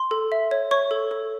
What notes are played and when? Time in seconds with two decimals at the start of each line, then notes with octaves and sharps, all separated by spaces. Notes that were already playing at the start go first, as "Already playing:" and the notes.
Already playing: C6
0.11 A4
0.32 E5
0.51 C#5
0.71 C#5 C#6
0.91 A4
1.11 A4